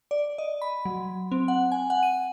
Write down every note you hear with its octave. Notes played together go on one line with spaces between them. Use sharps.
D5
D#5
B5
F#3
C4
F#5
G#5
F#5
D#7